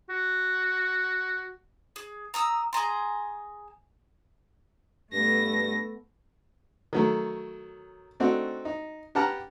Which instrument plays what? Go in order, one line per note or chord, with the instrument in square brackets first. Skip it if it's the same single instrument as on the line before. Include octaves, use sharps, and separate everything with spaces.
[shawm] F#4
[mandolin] G#4
A#5 D#6 E6
G#4 G#5 A#5 C6
[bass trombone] G2 [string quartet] A3 B3 [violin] A#6
[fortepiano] D#3 F#3 A3
A3 C4 D4 D#4 F#4
D#4
G4 B4 F#5 A5 A#5 F6